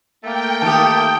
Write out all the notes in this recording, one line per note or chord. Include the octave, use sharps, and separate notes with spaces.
A3 A#3 G5
D#3 G4 A5 D#6